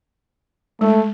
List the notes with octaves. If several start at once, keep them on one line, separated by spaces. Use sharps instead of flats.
G#3 A3